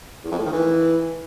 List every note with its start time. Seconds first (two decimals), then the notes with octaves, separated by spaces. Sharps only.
0.24 E2
0.31 F2
0.38 A2
0.46 D#3
0.53 E3